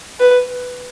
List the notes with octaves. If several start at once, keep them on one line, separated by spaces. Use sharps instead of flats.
B4